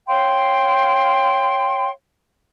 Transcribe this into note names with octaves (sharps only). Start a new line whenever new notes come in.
C#5 F5 G5 C6